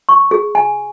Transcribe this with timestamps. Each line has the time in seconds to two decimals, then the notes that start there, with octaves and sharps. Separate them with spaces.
0.09 C#6
0.31 G#4
0.55 G#5